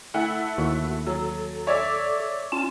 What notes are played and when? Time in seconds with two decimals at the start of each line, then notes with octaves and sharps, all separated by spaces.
0.14 A3 E4 F#5
0.58 D#2 F#4
1.06 F#3 A4
1.67 C#5 D5 E5
2.52 C#4 F4 A5